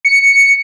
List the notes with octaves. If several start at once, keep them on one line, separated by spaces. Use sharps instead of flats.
C#7